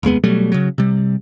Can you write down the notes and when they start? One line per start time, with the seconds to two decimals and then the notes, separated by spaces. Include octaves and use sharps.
0.03 F1 D#2 G#3 B3
0.24 B2 F#3 G3 A3
0.52 C#3 F#3
0.78 C3 G3